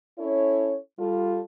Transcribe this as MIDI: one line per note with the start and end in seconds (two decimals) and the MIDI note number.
0.19 0.77 61
0.19 0.77 64
0.19 0.77 69
0.19 0.77 73
0.99 1.40 55
0.99 1.40 65
0.99 1.40 69